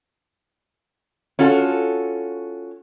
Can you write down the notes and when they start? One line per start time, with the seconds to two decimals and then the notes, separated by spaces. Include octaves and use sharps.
1.39 C#4 F4 F#4 A4